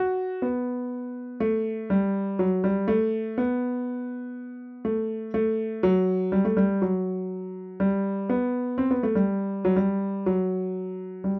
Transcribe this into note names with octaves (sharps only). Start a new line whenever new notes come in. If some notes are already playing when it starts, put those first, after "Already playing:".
Already playing: F#4
B3
A3
G3
F#3
G3
A3
B3
A3
A3
F#3
G3
A3
G3
F#3
G3
B3
C4
B3
A3
G3
F#3
G3
F#3
G3